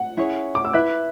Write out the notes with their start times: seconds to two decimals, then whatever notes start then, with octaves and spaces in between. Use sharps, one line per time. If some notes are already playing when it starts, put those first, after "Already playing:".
Already playing: F#5
0.17 C#4 E4 G#4 C#5
0.55 D6
0.65 E6
0.73 E4 B4 E5 F#6